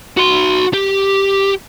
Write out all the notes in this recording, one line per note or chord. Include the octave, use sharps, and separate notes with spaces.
F#4 C6
G4